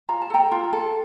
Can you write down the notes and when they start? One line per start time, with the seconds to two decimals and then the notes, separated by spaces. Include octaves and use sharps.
0.09 F4 A#5
0.21 A5
0.30 A4 G5 A#5
0.51 F4
0.73 A4